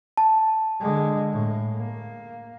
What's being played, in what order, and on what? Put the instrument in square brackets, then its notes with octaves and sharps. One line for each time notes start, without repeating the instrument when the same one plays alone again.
[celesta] A5
[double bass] D3 G#3
A2
A#3